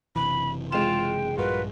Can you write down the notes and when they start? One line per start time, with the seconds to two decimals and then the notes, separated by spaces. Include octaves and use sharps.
0.16 F#1 C3 E3 B5
0.72 F3 G#3 F4 G5 E7
1.38 A#1 G2 G3 F4 F#4 A#4 B4